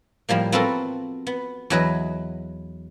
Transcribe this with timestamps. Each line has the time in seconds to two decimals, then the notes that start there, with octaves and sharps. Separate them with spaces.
0.29 A2 F3 G3 A#3
0.52 B3 C4 F4 F#4 A4 A#4
1.27 B3
1.70 E2 F#3 B4 D#5